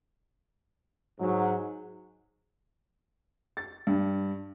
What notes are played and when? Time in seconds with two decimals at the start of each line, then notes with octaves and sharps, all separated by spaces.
1.20 G#2 F#3
3.57 A6
3.87 G2